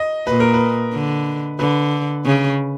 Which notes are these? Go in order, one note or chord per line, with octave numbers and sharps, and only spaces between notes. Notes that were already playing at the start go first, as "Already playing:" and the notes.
Already playing: D#5
A#2 B4
A#4
B4
D3
D3 B4
C#3